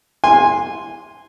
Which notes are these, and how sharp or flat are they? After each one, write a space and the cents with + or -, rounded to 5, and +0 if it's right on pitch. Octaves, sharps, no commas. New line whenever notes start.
G#5 -15 C6 +0